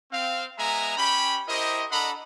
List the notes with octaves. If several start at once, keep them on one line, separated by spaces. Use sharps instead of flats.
C4 F5
G#3 B3 E5 G#5 A#5
C#4 G4 G5 B5
E4 G4 A#4 C5 D#5
D4 A4 D#5 F#5 A#5 B5